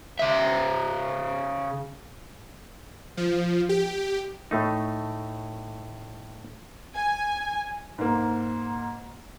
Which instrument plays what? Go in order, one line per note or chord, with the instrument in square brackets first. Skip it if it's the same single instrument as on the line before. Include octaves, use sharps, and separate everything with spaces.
[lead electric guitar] C#3 E5
[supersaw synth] F3
G4
[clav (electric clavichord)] A2 A3 D#4
[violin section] G#5
[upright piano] G#2 A#3